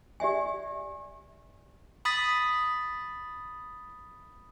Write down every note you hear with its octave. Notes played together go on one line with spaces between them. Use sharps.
G4 D5 E5 G#5
B5 D#6 A6 B6